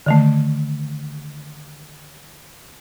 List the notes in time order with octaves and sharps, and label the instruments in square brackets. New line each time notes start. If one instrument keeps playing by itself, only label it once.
[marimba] D3 D#3 A3